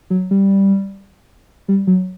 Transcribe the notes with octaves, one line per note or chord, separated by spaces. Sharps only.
F#3
G3
G3
F#3